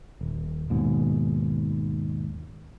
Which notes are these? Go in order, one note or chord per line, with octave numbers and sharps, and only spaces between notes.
D#1
D#2 G#2 B2